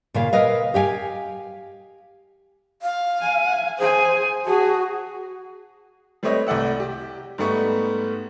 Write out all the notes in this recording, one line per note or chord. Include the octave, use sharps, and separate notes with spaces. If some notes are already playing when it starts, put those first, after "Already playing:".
A#2 C#3 F5
A#4 B4 D#5 F5
G4 F5 G5 G#5
F5
G#5
G#4 C5 G#5
F#4 G#4 A4
G3 A3 C4 B4 C#5 D#5
C2 A3 D5 F#5 E6
G4
G#2 G3 A3 B3 C#6